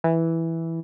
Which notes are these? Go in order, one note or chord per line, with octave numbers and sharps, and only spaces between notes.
E3